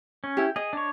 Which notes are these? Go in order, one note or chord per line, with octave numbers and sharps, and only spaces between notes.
C#4
E4 G4
G#4 D#5
D4 C#5